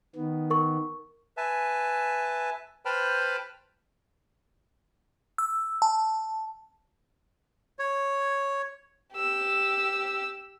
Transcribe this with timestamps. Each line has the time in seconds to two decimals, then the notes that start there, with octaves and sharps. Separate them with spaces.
0.16 D#3 B3
0.50 A#4 C#6
1.37 B4 E5 G#5 A5
2.85 B4 C5 G5 A5 B5 F6
5.38 E6
5.82 A5
7.79 C#5
9.13 G4 E6